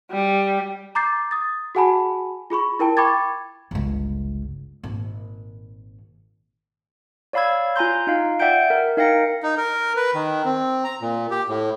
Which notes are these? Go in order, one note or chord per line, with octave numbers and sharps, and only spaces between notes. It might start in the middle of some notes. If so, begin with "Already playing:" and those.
G3
A#5 D6 G6 A6 C7
D#6 A6
F#4 G#4 F#5 G#5 A5 B5
F4 G#4 B5 C#6
E4 A#4 G5 A5
G5 B5 C#6 D6 G#6 A6
G1 C#2
G#1 A#2
C#5 D5 F5 B5 E6 G#6
F4 G#5 A#5 C6 G6
D#4 F4 F5
D5 E5 F#5 G5 G6 D7
A#4
D#4 A#4 F5 G5 A#6 C#7
D#4
A#4
B4
D#3
C4
A#5
A#2
G4
A2